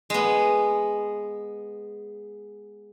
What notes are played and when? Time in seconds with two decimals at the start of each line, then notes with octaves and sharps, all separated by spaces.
0.10 G#3 B3